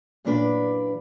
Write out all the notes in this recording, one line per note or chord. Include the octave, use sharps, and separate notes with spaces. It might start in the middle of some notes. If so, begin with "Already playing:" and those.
F#2 A#2 E3 D4 B4